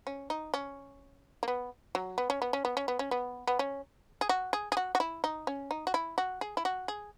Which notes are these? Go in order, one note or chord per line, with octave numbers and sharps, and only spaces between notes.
C#4
D#4
C#4
A#3
B3
F#3
B3
C#4
B3
C#4
B3
C#4
B3
C#4
B3
B3
C#4
G#4
F#4
G#4
G#4
F#4
F#4
E4
D#4
C#4
D#4
F#4
E4
F#4
G#4
E4
F#4
G#4